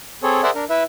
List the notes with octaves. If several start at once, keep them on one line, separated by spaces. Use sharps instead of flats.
C4 G#4 A4 C#5
G#4 A#4 C5 D5 E5 F#5
D4 A#4
E4 B4 E5